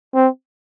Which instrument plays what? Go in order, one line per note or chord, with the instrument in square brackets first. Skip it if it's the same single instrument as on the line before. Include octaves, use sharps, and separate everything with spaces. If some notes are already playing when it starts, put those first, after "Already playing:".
[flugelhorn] C4